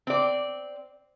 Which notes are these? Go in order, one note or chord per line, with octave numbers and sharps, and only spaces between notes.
C4 D5